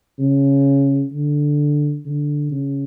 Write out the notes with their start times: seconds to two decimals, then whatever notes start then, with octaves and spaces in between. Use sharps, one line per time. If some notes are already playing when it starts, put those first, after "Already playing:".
0.18 C#3
1.12 D3
2.05 D3
2.51 C#3